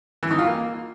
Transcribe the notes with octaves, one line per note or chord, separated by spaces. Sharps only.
E3
D#4
F4
A#3